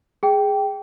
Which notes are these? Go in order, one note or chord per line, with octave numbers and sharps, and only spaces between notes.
G#4 G5